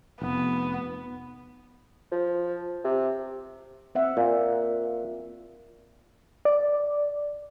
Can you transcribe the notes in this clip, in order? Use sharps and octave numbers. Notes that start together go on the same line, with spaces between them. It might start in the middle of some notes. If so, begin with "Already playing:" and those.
F1 B3
F3
C3
C4 E5 F#5
A#2
D5